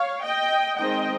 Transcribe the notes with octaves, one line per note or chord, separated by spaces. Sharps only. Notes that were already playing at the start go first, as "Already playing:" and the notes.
Already playing: C#5 F5
D#5 G5
D#3 G#3 C4 D#5 G5